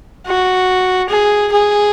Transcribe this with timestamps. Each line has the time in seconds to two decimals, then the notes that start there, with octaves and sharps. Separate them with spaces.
0.26 F#4
1.09 G#4
1.52 G#4